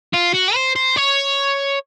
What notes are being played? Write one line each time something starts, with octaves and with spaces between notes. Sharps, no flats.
F4
F#4
C5
C5
C#5